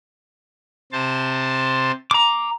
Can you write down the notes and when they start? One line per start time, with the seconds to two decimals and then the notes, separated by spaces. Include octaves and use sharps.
0.92 C3 C5 A5
2.11 A#5 D6